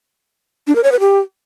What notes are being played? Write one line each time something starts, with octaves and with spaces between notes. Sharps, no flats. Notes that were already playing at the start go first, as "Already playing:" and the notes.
D4
A#4
C#5
B4
G4